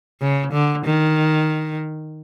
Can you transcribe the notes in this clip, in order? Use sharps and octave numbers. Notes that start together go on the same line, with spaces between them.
C#3
D3
D#3